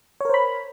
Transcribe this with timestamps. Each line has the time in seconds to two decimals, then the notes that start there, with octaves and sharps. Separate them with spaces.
0.21 C#5
0.25 A#4
0.30 C5
0.34 B5